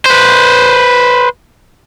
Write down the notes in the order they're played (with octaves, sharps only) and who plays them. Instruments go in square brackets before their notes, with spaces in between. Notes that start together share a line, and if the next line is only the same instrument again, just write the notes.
[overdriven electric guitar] B4 C5